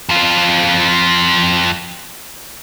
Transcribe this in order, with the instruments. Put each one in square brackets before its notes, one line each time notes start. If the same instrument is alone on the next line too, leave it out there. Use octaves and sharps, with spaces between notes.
[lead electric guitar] F2 F4